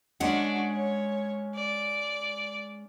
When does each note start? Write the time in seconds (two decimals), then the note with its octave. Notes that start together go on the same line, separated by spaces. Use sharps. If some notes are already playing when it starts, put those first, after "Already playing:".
0.20 G#3 C#4 D4 F#4 F#5
0.71 C#5
1.54 D5